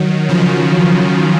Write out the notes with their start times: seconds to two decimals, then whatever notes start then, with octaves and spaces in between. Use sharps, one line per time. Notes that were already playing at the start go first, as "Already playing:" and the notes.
Already playing: D#3 F#3
0.29 C#3 F3